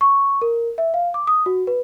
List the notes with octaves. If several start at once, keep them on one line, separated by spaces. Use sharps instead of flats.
C#6
A#4
E5
F5
D6
D#6
F#4
B4